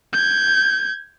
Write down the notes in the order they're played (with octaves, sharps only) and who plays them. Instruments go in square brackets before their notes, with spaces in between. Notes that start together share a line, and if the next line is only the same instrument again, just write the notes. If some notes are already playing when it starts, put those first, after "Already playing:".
[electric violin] G6 G#6